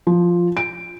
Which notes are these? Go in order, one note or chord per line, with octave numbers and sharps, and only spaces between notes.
F3
D7